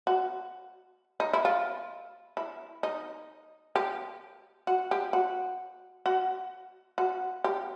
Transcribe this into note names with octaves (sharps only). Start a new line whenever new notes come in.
F#4
D#4
E4
F4
E4
D#4
G4
F#4
G4
F#4
F#4
F#4
G4